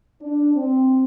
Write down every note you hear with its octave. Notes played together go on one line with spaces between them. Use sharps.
D4
C4